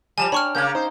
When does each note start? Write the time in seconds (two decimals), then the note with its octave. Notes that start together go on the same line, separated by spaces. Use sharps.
0.18 F3 G3 G#5 A5 F7
0.32 D4 C#5 G5 B5 C#6 D6 F6
0.55 C#3 A#3 C#4 G6 G#6
0.75 D#4 C5